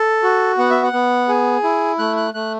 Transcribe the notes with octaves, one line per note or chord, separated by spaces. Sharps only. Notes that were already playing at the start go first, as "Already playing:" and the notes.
Already playing: A4
F#4
B3 F#5
E5
F#5
B3
G#4
E4
A3 F#6
F#6
A3 F#6